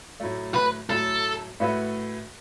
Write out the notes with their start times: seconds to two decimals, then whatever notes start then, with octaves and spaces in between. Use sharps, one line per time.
0.20 A2 F#3 A3
0.54 B4
0.90 A2 F#3 A3 A4
1.60 A2 A3 F#4 B4 E5